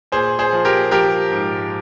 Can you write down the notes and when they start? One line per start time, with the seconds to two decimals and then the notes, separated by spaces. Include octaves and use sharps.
0.12 A#2 G#4 C5
0.39 G#4 C5
0.53 F3
0.65 G4 A#4
0.91 F3 G4 A#4
1.31 G#2